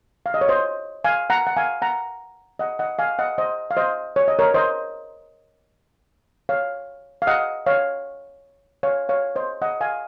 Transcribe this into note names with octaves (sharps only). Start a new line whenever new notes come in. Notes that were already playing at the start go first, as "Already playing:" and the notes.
F5
D#5
C#5
C5 D#5
F5 G#5
F#5 A#5
F#5
F5 G#5
F#5 A#5
D#5 F#5
D#5 F#5
F5 G#5
D#5 F#5
C5 D#5
F5
C5 D#5
C#5
D#5
A#4 C#5
C5 D#5
C#5 F5
F5
D#5 F#5
C#5 F5
C#5 F5
C#5 F5
C5 D#5
D#5 F#5
F5 G#5